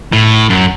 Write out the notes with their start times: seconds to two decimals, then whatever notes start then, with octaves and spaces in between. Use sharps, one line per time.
0.12 A2
0.49 F#2